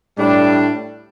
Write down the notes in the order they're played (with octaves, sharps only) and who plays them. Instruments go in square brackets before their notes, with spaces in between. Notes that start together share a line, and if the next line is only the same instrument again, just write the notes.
[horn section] A2 G3 D4